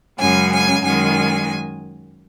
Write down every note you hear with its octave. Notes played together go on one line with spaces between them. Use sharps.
F#2 C#3 G#3 G#5
G#5
F#2 D#3 G#3 G#5